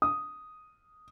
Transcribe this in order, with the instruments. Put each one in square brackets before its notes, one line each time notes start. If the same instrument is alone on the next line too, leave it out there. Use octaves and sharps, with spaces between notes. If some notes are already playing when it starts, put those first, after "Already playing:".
[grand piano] D#6